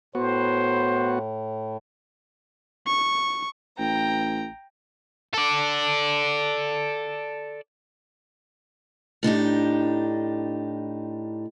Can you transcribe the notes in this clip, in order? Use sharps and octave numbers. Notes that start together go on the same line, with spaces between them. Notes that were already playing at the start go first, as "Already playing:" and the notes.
A2 B3 F#4 C5
C#6
A1 G5 A#5
A4 D5
A2 D4 D#4 G4